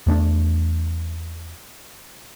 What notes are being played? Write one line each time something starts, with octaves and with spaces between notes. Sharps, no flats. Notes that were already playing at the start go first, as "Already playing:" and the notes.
E2 A3 C4 D4